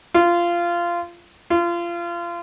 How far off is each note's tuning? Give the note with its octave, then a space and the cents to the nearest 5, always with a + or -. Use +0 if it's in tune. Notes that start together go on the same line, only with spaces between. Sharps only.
F4 -15
F4 -25